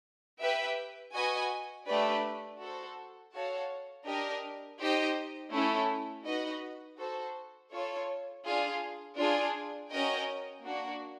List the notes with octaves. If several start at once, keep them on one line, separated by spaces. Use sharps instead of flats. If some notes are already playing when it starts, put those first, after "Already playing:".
G4 B4 E5 G5
F#4 B4 D#5 G#5
A3 D4 G4 B4 D5
F#4 A4 C5
F#4 A4 C#5 F5 A5
D4 G4 A#4 D#5
D#4 G4 C5 D#5
A3 C#4 E4 A4
D#4 F#4 B4 D#5
F#4 A4 C5
F4 A4 C#5
D4 F4 G#4
D4 F4 G#4
C#4 F#4 A#4 D#5 G5
A#3 D4 F#4